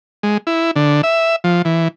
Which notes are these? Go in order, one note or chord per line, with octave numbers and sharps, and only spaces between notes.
G#3
E4
D3
E5
F3
E3